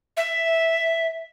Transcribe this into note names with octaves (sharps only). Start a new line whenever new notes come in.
E5